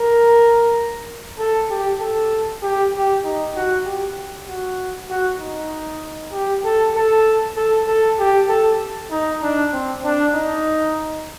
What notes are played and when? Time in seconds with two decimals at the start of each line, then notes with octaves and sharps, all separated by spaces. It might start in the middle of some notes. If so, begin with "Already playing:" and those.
Already playing: A#4
1.39 A4
1.70 G4
2.01 A4
2.62 G4
2.93 G4
3.24 D#4
3.56 F#4
3.85 G4
4.48 F#4
5.10 F#4
5.40 D#4
6.33 G4
6.64 A4
6.95 A4
7.57 A4
7.88 A4
8.19 G4
8.49 A4
9.11 D#4
9.43 D4
9.73 C4
10.04 D4
10.34 D#4